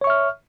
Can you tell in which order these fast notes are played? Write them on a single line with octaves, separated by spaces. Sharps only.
C#5 C#6 E5 F6